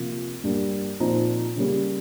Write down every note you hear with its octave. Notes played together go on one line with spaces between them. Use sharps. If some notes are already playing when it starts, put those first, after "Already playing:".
Already playing: C3 F3 A#3 F4
G2 G3 A#3
A#2 F3 C4 D#4
C#3 G3 A#3 C#4 G4